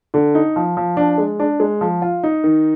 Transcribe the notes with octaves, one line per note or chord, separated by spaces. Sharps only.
D3
D#4
F3
F3
D4
G#3
D4
G#3
F3
F4
D#4
D#3